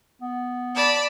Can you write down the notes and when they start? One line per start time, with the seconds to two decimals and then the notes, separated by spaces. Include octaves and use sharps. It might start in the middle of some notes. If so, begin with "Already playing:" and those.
0.22 B3
0.74 D5 A5 B5